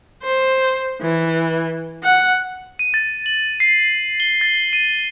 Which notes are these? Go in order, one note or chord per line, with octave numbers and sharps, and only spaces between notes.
C5
E3
F#5
D#7
A6
F#7
C7
G7
A6
D#7